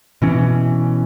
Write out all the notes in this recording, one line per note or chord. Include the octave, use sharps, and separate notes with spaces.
B2 E3 C#4